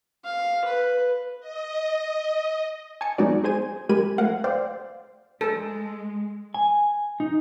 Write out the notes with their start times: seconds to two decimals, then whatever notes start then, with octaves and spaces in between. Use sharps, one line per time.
0.25 F5
0.64 B4
1.40 D#5
3.01 G#5 A5 D#6 C#7
3.18 F#3 G#3 B3 D#4 F#4 D5
3.44 G#4 C5 G#5 D#7
3.89 G#3 G4 A#4 B5 G#6 D#7
4.18 F3 A3 A#4 F5 F#5
4.44 C5 D5 F5 G5
5.41 G#3 A4
6.54 G#5
7.20 D#4